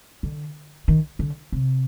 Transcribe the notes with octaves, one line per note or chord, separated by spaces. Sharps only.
D3
D#3
D3
C3